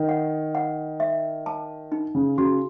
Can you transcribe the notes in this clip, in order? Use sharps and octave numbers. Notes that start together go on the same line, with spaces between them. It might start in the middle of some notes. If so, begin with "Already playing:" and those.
Already playing: D#3
F#5
F#5
E5
A5
D#4
C#3
C#3 F#4